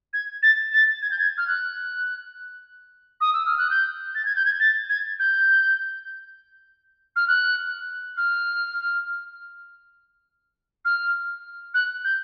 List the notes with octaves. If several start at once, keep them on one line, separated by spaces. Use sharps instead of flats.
G#6
A6
A6
G#6
G6
G#6
F6
F#6
D#6
E6
F6
F#6
G6
A6
G#6
G6
G#6
A6
G#6
G6
F6
F#6
F6
F6
F#6
G6